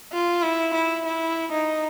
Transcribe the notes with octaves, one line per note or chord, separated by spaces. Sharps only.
F4
E4
E4
E4
D#4